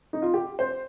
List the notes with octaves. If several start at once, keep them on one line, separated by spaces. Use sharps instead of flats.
D#4
F4
G4
C5